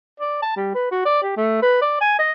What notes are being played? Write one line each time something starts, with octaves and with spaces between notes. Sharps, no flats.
D5
A5
G3
B4
F#4
D5
G4
A3
B4
D5
G#5
D#5